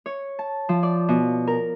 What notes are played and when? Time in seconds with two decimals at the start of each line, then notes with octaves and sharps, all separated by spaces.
0.06 C#5
0.39 A5
0.69 F3
0.83 D5
1.09 B2
1.47 A#4